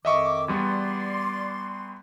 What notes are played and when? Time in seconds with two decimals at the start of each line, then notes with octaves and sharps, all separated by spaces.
0.05 F2 D#3 D#5 E5 C#6 D6
0.48 E2 G3 B3 D5 C6